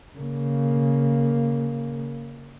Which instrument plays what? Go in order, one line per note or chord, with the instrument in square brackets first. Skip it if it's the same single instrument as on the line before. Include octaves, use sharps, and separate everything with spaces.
[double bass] C#3 A#3